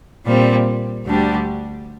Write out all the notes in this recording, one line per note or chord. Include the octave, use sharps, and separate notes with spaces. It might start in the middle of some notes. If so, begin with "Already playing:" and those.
A#2 G3 C4
D2 D3 G3 D4 G4